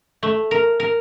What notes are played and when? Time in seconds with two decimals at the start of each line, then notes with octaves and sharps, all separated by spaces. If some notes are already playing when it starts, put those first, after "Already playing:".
0.23 A3
0.51 A#4
0.80 A#4